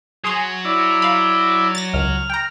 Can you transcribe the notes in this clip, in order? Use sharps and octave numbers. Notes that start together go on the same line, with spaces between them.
F#3 G#4 C6 D#6
E4 D5
F5 B5
A6 A#6
C#2 F6
G5 A#5